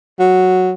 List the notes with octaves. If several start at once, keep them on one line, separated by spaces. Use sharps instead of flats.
F#3